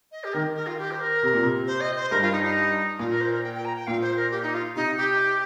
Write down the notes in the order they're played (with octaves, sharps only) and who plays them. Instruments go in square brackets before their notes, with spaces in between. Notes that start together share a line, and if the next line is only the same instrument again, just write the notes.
[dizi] D#5
G4
[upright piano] D#3 [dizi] A#4
[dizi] A#4
F4
G4
C5
A#4
[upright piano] C3
A#2
C3
[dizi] C5
D#5
C5
[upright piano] G2 [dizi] A#4
[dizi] F4
D#4
D#4
[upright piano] A#2 [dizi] F4
[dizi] A#4
C5
A#4
G5
G5
A#5
G5
[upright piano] A#2 [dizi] F5
[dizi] C5
A#4
G4
D#4
F4
[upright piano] C3 [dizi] D#4
[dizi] G4